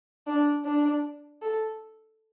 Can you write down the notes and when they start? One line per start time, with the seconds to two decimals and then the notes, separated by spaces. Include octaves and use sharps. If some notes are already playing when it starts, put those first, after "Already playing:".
0.27 D4
0.65 D4
1.42 A4